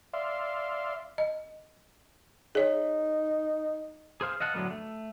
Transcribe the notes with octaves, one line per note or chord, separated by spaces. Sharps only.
D5 E5 F5 C6
D#5
D#4 G#4 C#5
G#4 C5 F5
D#5 F5 F#5 A5
A2 D3 F#3 A#3 B3
A3